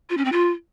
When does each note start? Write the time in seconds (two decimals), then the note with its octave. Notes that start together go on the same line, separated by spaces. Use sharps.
0.10 F4
0.17 C#4
0.25 C4
0.32 F4